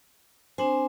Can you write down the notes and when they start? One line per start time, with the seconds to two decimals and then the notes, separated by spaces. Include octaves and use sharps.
0.58 C4 D4 C5 G#5